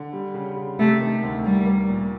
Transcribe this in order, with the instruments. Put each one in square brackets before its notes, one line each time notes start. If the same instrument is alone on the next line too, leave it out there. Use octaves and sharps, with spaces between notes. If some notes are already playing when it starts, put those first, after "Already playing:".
Already playing: [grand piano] D3
G3
C#3
C#3
[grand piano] C3 [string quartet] A3
[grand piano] D#3
D2
[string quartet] G3 [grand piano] A#3
[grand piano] A#3
A#2